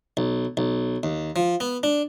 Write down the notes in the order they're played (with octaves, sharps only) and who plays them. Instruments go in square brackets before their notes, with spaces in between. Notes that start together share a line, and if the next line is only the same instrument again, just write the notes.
[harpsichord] B1
B1
D#2
F3
B3
D4